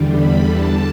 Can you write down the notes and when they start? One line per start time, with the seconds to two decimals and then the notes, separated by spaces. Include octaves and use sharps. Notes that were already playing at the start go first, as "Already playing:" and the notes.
Already playing: E2 D3 G3
0.11 B5
0.44 A5